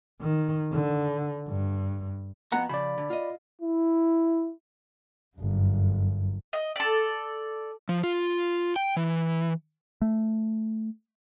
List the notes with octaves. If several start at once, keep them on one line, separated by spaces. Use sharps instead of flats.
D#3
D3
G2
F2 B3 F#5 A#5
C#3 F3 D5 B5
D3
F4 D#5
E4
G1 F#2
D#5
A4 D5
F3
F4
G5
E3
A3